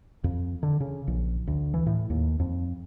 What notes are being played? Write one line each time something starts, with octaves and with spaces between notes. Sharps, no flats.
F2
D3
C#3
A#1
D2
E3
A2
D#2
F2